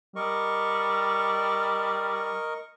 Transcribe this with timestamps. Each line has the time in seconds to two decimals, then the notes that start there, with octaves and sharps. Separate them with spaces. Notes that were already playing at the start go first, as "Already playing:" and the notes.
0.16 G3 A#4 D#5 C#6